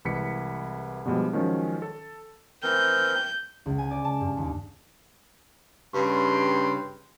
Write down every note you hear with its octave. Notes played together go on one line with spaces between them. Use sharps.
C2 E3 G#3 B6 C#7
G2 B2 F3 G3 G#3
D#3 F3 F#3 G#3 C#4
A4
E3 C4 A#4 G6
C#2
G#5
D5
A5
G2
D#2
G2 C#3 G5 C6